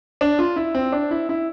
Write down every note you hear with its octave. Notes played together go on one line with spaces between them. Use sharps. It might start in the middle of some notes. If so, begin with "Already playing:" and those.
D4
F4
E4
C4
D4
E4
E4